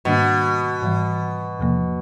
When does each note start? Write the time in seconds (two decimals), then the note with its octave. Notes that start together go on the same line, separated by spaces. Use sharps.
0.05 G#2 B2 D#3 G3 A#3 D4
0.81 G#2 E3 G3
1.59 E2 C3 F3 A#3